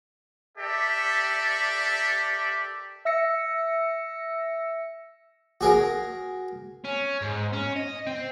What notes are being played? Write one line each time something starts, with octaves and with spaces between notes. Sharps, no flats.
G4 A4 A#4 D5 E5
E5 E6 A#6 C#7
F#4 G#4 A#4
C#4
G#2
C#4
D#5
C4